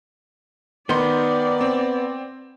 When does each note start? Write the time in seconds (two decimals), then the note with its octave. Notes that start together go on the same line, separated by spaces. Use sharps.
0.89 D#3 B3 D#4 D5 C6
1.61 C4